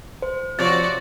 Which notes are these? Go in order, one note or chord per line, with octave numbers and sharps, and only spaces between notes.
C5
C3 F3 F#4 C#5 D5 A6